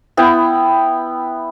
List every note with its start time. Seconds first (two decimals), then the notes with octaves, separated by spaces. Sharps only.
0.17 B3 E4 G5